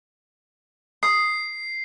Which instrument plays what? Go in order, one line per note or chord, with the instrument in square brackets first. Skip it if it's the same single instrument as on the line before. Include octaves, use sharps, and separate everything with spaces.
[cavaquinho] D#6 [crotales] C7